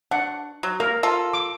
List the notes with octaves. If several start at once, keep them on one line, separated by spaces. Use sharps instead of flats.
D4 F#5
F#3
A#3 A#4
F4 A4
D6